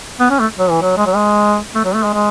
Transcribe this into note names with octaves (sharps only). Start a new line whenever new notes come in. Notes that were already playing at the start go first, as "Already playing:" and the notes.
B3
C#4
A3
F#3
E3
F#3
G#3
F#3
G#3
A3
F#3
A3
G#3
G#3